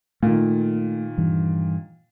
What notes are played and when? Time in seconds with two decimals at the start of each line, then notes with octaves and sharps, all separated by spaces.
0.23 A#2 D#3 A3
1.18 G2 E3